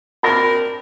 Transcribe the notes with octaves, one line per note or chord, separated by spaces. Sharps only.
C4 D4 A#4 B5 A#6